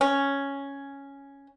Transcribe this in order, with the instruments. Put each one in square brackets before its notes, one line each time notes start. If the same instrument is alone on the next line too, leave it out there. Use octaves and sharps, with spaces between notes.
[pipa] C#4